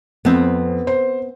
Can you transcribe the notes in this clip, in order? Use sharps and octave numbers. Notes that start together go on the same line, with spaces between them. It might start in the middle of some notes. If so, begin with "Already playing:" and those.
F2 B3 C4
C5